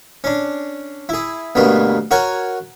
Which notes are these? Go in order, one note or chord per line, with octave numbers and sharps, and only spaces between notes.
C#4 D4
E4 G#4
D2 G2 B2 A#3 B3
F#4 A#4 C#5 F#5 G#5